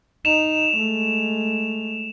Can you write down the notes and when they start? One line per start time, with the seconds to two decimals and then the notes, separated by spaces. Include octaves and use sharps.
0.25 D#4 E7 F7
0.76 G#3 A3